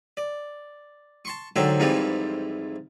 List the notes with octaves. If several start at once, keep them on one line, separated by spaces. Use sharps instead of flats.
D5
A5 C6 C#6
G#2 D3 F#3 G4 C5 E5
F2 G#2 E3 F3 G3 C4